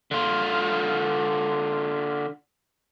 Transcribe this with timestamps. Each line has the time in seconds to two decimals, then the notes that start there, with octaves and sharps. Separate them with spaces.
0.11 D3 F4